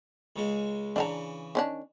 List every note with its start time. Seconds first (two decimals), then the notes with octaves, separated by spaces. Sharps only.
0.36 C#2 C#3 G#3
0.96 C#3 E3 D4 E5 A#5
1.55 D#3 C#4 D4